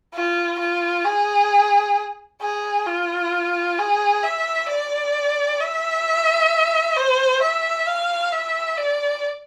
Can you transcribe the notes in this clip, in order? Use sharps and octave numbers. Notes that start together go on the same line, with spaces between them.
F4
F4
G#4
G#4
F4
G#4
E5
D5
E5
C5
E5
F5
E5
D5